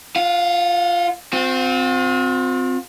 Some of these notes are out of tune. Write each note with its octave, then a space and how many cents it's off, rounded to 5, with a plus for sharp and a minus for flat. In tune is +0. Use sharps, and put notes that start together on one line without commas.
F4 +0 F#5 -40
C4 -15 F4 +40